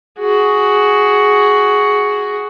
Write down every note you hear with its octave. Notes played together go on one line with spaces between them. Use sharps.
F#4 G#4